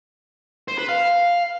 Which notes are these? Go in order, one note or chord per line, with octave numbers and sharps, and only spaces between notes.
C5
B4
F5